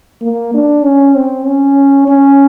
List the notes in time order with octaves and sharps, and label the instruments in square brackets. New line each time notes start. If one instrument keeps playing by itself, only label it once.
[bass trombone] A#3
D4
C#4
C4
C#4
C#4